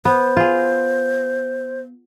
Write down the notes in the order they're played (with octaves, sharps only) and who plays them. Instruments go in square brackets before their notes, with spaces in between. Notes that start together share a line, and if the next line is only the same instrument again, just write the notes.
[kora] B3 [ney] C5
[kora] F4 G#4